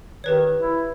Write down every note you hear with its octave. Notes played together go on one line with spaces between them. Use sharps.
D#3 G4 B4 C#5
E4